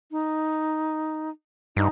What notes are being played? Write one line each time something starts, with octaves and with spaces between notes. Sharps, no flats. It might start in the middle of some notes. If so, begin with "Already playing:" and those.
D#4
G2 D#4